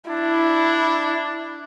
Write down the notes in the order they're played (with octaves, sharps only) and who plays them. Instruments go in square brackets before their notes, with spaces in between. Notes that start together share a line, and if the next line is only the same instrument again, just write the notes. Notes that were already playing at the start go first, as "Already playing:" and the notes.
[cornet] D4 [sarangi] E4